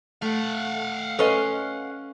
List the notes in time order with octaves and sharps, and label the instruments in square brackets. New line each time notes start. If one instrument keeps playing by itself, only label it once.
[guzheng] A3 [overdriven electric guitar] F5 F#5
[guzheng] C#4 C6 [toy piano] A4 B4 D#5